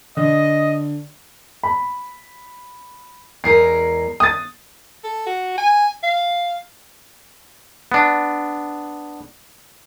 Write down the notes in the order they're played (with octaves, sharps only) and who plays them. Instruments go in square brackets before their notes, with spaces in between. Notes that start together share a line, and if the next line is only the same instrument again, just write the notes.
[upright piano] D3 [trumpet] D#5
[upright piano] B5
[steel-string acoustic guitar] E2 G#3 A#4 [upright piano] C7
[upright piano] D#6 A6
[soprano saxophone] A4
F#4
G#5
F5
[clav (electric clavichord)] B3 D4